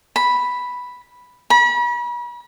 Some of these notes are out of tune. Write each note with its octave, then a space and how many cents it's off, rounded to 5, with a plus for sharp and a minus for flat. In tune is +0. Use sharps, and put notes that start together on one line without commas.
B5 +0
B5 -40